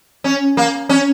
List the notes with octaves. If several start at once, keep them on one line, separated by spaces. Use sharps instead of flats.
C#4
A#3
C#4